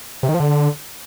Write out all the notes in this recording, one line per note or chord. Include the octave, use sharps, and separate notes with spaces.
C3
D#3
F3
D3